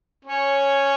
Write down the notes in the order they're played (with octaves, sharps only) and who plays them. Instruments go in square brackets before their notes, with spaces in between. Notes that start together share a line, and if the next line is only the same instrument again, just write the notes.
[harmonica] C#4 C#5